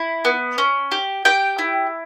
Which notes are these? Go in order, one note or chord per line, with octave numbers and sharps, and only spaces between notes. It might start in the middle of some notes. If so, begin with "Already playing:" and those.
Already playing: E4
B3
C#4
G4
G4 G5
E4